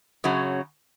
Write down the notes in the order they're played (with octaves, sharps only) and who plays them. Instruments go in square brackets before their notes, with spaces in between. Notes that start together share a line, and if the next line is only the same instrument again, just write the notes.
[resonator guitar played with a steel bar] F#2 C#3 F#3 C#4